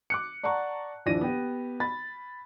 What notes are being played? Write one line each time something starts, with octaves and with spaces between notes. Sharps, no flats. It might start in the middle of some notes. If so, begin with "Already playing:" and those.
D6 F#6 C#7
D5 F#5 A5 A#5 C#6
D#1 F3 D4 E4 A#6 D#7
B3 G4
B5 A6